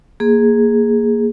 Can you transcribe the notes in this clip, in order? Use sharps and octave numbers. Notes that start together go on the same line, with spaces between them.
A#3 G#4